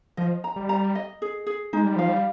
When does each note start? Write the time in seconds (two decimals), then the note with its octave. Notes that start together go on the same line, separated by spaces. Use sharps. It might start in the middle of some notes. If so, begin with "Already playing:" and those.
0.17 F3 D#5
0.44 A#5
0.56 G3
0.69 A#5
0.95 D#5
1.22 G#4
1.47 G#4
1.73 G#3 D#4
1.84 G3
1.96 F3 F5
2.08 G3